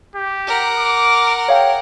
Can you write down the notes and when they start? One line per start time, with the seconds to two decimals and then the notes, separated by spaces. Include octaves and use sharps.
0.16 G4
0.47 A#4 F#5
0.79 D6
1.48 G#4 C#5 F5 G5